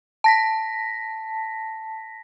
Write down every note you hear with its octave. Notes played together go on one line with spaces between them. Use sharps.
A5 A#6 B6